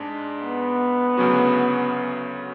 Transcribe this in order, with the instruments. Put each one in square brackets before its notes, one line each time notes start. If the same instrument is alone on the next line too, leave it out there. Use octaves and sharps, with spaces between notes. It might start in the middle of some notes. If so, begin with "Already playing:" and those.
Already playing: [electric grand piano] G#2 G#3 D4
[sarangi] B3
[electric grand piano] D2 C#3 F#3 C#4 F#4